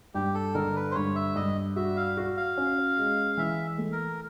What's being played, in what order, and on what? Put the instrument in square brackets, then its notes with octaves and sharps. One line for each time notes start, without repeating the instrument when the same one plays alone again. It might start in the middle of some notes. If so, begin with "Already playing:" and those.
[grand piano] G2 [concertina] G4
[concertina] A4
[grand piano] D3 [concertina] A#4
[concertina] B4
C5
[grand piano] G2 [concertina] C#5
[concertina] E5
[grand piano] G2 [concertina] D#5
[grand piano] F#4 [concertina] E5
[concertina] F5
[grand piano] F#4
[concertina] F5
[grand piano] C#4
G#3
[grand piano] E3 [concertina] E5
[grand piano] A3
[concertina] A#4